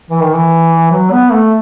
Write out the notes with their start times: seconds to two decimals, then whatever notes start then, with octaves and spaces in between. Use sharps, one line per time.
0.11 E3
0.23 D#3
0.34 E3
0.92 F#3
1.12 B3
1.32 A3